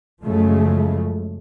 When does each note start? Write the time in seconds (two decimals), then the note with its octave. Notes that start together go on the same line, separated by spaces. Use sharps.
0.23 F#2 C#3 F3 G#3 A3